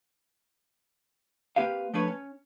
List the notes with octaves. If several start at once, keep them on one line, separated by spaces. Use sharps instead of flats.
A#3 C4 G4 B4 F5
F3 A3 D4 B4 C#5
C#4